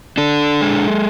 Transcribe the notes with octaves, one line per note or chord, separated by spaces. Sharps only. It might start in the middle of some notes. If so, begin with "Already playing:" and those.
D4 A4
G#3